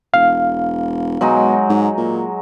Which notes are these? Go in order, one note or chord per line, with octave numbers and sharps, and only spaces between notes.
E1 F5
B2 F#3 G#3 D#4
G#2
A#2